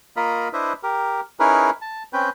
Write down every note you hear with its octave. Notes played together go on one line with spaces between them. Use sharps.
A#3 F4 A#4 D#5 B5
D4 E4 B4 C5 D#5 E5
G4 A#4
C#4 D#4 E4 G#4 A#4 B4
A5
C4 C#4 B4 G5